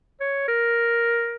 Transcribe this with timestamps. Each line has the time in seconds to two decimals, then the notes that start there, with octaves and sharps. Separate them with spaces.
0.21 C#5
0.48 A#4